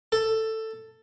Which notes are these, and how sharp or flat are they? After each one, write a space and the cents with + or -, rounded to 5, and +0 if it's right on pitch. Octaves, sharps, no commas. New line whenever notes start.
A4 +10